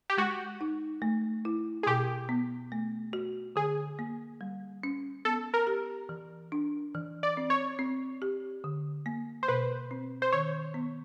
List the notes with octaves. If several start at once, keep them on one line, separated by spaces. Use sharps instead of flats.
G4
G#3 F#4
D#4
A3
E4
G#4
B2 G4
B3
A3
F#4
D3 G#4
A#3
G3
C#4
B3 A4
A#4
G4
E3
D4
E3
D5
C4
C#5
C4
G4
D3
A#3
C5
B2 B4
C4
C5
D#3 C#5
B3